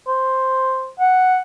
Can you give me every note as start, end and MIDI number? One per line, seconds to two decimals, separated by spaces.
0.07 0.91 72
0.99 1.39 78